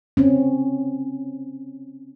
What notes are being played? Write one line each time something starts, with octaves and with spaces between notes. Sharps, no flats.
C4 C#4